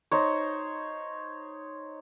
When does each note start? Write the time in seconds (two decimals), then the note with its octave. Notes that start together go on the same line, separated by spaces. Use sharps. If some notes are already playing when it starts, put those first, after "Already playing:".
0.12 D#4 C5 C#5